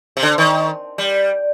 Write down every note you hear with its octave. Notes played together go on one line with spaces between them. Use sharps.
C3
D3
D#3
G3